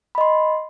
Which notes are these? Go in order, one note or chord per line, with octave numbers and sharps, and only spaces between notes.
D#5 B5 C6